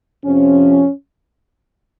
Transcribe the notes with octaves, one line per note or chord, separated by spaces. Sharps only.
F2 C3 F3 C#4